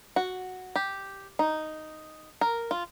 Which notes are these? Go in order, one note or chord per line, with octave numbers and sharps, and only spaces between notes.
F#4
G4
D#4
A#4
F4